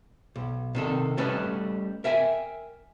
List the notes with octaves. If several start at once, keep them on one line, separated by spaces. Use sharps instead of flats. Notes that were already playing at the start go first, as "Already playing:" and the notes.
B1
C3 D#3 A4
G3 A3 C#4 A4 B4 D#5
A#4 E5 G5 G#5